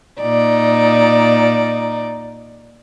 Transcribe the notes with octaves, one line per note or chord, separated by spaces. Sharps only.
A#2 D#4 D5